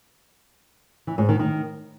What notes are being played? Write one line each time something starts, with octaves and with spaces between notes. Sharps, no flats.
E3
G#2
D#3
D#3